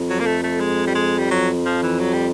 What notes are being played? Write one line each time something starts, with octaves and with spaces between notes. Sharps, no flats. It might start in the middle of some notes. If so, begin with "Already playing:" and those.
Already playing: F2
F#3
A#3
A3
A3
G#3
G3
G#3
G3
F#3
F3
E3
F#3
G3